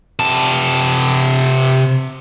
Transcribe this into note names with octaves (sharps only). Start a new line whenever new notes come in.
C3 A5